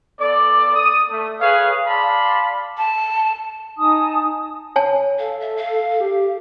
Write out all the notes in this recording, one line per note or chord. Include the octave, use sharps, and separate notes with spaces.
B3 A4 D5
D#6
A3
G#4 B4 C#5 F5
D5 F5 A5 B5 C6
A5
D#4 G#5 A5 D#6
C#5 G#5 A5
A4 F5
E5
F5
G4